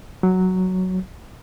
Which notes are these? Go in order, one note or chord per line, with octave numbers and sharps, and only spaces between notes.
F#3